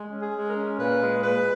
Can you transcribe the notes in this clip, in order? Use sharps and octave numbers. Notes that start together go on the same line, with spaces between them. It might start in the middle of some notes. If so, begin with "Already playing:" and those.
Already playing: G#3
C#4
G#4
G#3
A#4
C#4
A#2 B4
G#3
A#2 B4